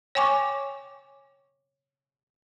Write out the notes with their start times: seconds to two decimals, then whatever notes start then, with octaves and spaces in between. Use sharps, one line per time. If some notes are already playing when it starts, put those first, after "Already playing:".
0.15 C#5 G5 G#5 C#6 D6